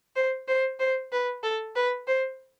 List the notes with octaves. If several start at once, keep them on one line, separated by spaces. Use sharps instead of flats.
C5
C5
C5
B4
A4
B4
C5